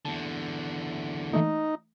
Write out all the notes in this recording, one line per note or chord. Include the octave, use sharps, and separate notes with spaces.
E2 D3 A5
E3 A3 A#3 D#4